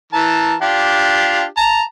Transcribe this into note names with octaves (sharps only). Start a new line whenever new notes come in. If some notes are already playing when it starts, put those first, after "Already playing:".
E3 A#4 A5
D4 F4 G4
A5 A#5